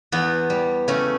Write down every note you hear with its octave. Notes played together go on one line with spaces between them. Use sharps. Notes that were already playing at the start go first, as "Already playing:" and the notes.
E2 B3
G3
C#3 A3 C#4